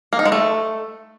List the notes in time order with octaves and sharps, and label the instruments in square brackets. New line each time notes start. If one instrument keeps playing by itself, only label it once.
[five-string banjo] A#3
D#4
G#3
A3